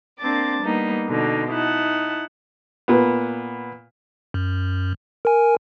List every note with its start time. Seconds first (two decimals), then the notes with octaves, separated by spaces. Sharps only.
0.19 A#3 C4 D4 D6 A6
0.62 G3 A#3 B3 D#4
1.07 B2 D3 D#4
1.51 D#4 E4 F#5 A5
2.88 A#2 B3
4.34 F#2
5.25 A#4 G#5